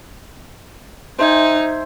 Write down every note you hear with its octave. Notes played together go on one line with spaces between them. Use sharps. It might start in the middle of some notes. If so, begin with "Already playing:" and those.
D#4 C5 E5 G#5